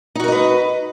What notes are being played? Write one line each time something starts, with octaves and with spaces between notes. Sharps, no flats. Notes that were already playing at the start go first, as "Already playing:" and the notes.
D#4 F#4 A#4 B4 D#5